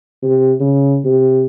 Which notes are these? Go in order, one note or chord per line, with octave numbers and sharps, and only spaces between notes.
C3
C#3
C3